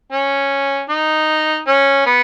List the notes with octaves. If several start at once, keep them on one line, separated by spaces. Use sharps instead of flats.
C#4
D#4
C#4
B3